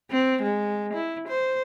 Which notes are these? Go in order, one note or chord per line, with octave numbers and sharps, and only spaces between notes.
C4
G#3
E4
C5